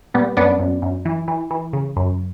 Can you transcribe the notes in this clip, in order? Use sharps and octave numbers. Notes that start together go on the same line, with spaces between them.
A#2 G3 B3
F#2 B3 D4
F#2
F#2
E3
E3
E3
C#3
F#2